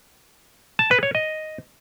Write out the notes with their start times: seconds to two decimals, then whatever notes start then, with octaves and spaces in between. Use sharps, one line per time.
0.79 A5
0.91 B4
1.03 C#5
1.15 D#5